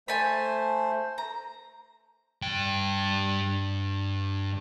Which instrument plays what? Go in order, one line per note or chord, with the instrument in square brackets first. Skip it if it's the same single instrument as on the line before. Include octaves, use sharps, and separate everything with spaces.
[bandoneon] A3 C5 [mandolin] G#5 A5 B5
[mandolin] A#5
[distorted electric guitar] G2 G5